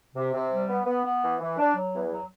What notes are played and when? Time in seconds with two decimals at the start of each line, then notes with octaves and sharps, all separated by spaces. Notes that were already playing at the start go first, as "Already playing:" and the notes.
0.15 C3
0.34 C3
0.51 G3
0.69 B3
0.86 B3
1.05 B3
1.22 E3
1.40 E3
1.58 D4
1.75 F#3
1.93 E2
2.11 F#3